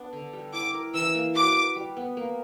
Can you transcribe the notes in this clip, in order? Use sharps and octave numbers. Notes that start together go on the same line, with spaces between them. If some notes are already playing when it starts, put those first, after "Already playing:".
Already playing: B3 D4
D3
G3
E4 D6
A#4
E3 E6
A#3
F#4 D6
B4
G3
B3
A#3